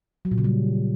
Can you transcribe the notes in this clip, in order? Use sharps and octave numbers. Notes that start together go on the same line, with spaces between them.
F#3
A#2
C#3
G3